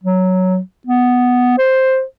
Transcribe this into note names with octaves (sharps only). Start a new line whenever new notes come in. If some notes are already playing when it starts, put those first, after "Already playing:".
F#3
B3
C5